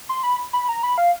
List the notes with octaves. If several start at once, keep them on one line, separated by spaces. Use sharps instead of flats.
C6
B5
B5
A#5
B5
F5